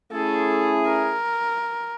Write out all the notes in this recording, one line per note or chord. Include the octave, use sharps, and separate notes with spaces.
A3 C#4 E4 G#4 A4
A#4